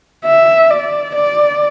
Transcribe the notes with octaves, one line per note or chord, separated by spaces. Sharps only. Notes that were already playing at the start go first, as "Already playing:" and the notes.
E5
D5
D5